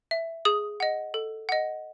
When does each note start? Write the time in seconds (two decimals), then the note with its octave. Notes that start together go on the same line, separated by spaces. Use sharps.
0.11 E5
0.45 G#4 D#6
0.80 D#5 F#5
1.14 A4
1.49 D#5 F#5